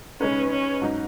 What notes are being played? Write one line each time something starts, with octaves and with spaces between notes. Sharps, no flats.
C#3 G#3 C#4 D#4 B4
C#4
G#2 F#3 D#4